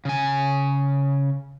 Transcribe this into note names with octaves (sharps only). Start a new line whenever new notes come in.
C#3 G#5